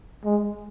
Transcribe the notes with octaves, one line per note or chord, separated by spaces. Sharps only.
G#3